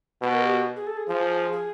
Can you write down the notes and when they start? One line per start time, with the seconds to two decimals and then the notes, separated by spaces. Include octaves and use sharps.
0.22 B2 B4
0.33 A#4
0.43 G4
0.54 F#4
0.76 G#4
0.87 A4
0.97 G#4
1.08 F3 G#4
1.52 G#4